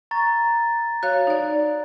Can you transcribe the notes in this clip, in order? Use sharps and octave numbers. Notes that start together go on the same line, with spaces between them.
A#5 C#6 A6
F#4 C#5 F5 F#6
D#4 D5